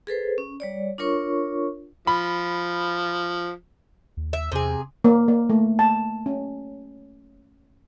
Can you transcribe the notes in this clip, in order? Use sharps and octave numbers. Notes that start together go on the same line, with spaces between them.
G#4 A4 B4 C5
C#4
G3 C#5 D5
D4 F4 A#4 C#5 C#6
F3 B5
D#2
E5
E2 C3 G#4
A#3
A#3
A3
A5
C#4